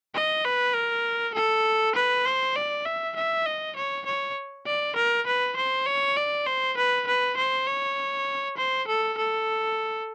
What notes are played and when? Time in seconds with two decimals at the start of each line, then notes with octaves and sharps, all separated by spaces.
0.15 D#5
0.45 B4
0.75 A#4
1.35 A4
1.95 B4
2.26 C5
2.56 D5
2.86 E5
3.16 E5
3.46 D#5
3.76 C#5
4.06 C#5
4.67 D5
4.96 A#4
5.27 B4
5.57 C5
5.87 C#5
6.17 D5
6.46 C5
6.77 B4
7.07 B4
7.37 C5
7.67 C#5
8.58 C5
8.88 A4
9.18 A4